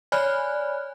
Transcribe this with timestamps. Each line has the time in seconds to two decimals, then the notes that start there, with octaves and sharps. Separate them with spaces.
0.12 C#5 D5 G#5 B5 F6 F#6